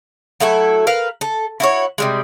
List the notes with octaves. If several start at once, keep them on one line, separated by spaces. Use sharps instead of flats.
F#3 A3 E4 A4
A#4 B4 F5
A4
E4 F#4 C#5
C3 G3 G#3